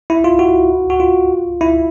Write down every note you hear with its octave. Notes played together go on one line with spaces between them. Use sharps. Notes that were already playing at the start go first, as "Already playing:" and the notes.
E4
F4
F#4
F#4
F4
E4